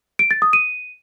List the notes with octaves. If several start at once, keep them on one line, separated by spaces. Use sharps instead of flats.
D7
A6
D#6
D#7